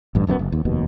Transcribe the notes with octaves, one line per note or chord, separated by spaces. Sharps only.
A1 G2
D1 F#2 G#3 B3
F#1
D#2
F1 D#2 B2